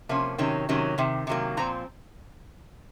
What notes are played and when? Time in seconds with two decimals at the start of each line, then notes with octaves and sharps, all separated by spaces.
0.09 C3 F3 A#3 C#4
0.38 C3 D#3 F#3 C#4
0.69 C3 D#3 F#3 C#4
0.98 C3 D#3
1.27 C3 D#3 F#3 A#3
1.57 A#2 F3 C4 A#5